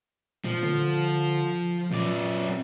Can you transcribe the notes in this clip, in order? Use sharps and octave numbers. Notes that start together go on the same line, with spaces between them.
A#2 F3
D3
F#2 A#2 D5